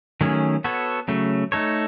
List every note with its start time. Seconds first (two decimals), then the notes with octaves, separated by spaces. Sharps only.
0.21 D#3 F#3 A3 C#4 G#4
0.64 B3 F#4 A4 C#5
1.08 C#3 F#3 A3
1.52 A3 D#4 A4 C#5